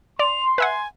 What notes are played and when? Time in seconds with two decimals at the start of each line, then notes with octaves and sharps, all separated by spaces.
0.19 D5 C6 F7
0.58 B4 E5 F#5 G#5